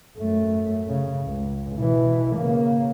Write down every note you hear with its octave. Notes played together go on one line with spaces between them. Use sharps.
F#2 A3
C#3
C#2
B2 E3
C#3 A#3